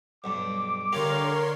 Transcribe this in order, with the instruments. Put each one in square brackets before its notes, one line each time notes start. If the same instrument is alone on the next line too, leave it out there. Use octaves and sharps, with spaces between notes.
[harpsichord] B1 G2 [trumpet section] D6
[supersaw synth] D3 C#5 C6 [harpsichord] G4 F5 A#5 [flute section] A#4